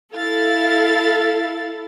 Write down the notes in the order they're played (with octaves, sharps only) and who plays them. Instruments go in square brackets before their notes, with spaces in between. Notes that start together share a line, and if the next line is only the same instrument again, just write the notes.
[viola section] E4 A4 [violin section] F5 A6